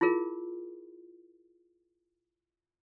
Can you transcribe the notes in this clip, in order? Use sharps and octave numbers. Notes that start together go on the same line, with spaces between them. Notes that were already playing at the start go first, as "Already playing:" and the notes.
E4 F4 G#4 A#4